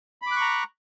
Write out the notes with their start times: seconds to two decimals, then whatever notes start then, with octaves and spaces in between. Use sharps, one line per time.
0.22 B5
0.27 D6
0.32 F#6
0.36 C#6
0.41 A#5